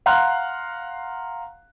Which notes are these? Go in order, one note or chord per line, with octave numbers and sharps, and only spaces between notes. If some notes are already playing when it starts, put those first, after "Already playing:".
F5 F#5 A#5 C6 F6 F#6